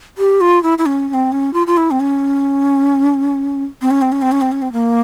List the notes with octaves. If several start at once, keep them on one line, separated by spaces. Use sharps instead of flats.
G4
F4
E4
E4
C#4
C#4
C4
C#4
F4
F4
E4
C4
C#4
C4
C#4
C4
C#4
C4
C#4
C4
C#4
C4
A#3